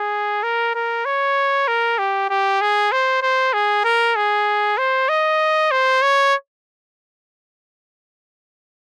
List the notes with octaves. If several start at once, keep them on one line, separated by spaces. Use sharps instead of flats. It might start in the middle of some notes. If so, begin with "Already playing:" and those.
Already playing: G#4
A#4
A#4
C#5
A#4
G4
G4
G#4
C5
C5
G#4
A#4
G#4
C5
D#5
C5
C#5